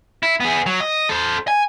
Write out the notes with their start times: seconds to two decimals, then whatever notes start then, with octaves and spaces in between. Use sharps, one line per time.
0.23 E4
0.40 B3 G#4
0.66 F#3
0.80 D#5
1.09 A4 C5
1.48 G#5